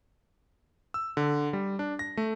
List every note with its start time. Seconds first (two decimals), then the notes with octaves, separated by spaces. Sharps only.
0.94 E6
1.17 D3
1.53 G3
1.79 D4
1.99 A#6
2.17 A3